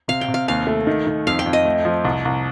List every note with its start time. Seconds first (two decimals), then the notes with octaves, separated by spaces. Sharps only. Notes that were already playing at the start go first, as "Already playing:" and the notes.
0.08 C3 F5
0.21 G5
0.28 C3
0.34 F5
0.48 D#2 F5
0.67 A3
0.87 D#3
1.06 D#3
1.27 F2 F5
1.39 G5
1.46 F2
1.53 D#5
1.65 A3
1.85 F3
2.05 C2
2.25 C2